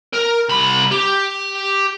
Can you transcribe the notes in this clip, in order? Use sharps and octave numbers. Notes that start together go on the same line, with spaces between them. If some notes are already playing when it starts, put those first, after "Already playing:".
A#4
C2 B5
G4